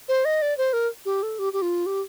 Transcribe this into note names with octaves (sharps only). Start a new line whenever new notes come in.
C5
D#5
D5
C5
A#4
G4
A4
G4
G4
F4
G4